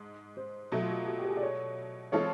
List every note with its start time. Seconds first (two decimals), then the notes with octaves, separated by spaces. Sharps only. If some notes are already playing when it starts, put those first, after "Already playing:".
Already playing: G#2
0.37 C5
0.72 B2 F#3 A3 F#4
0.81 F4
0.91 F#4
1.07 F#4
1.19 G4
1.25 A4
1.30 G#4
1.37 D5
1.43 C#5
2.12 E3 G#3 C4 F4 A4 C#5